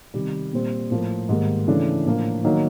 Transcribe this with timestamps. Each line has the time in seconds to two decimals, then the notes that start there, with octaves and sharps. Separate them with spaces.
0.14 C3 D#3 G3
0.53 A#2 G3 C4
0.91 A2 F3 A#3
1.29 G#2 D#3 G3 A#3
1.68 C#3 E3 A3 D4
2.06 A2 F3 A#3 D4
2.44 D#3 F#3 A#3 D#4